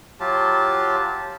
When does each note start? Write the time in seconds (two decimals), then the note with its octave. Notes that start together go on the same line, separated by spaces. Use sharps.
0.20 F#3 F4 G4 A5